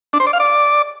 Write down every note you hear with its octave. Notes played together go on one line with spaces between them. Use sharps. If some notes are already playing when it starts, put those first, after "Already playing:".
D4
C5
D5
F5
D5